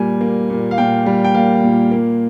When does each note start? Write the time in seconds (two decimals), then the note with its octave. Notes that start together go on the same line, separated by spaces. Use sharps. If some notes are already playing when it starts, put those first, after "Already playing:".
Already playing: A#2 G3 G#5
0.21 A#3
0.50 A#2
0.71 F5
0.78 A#2 G5
1.06 G3
1.24 G5
1.34 A#3 F5
1.63 A#2
1.91 A#3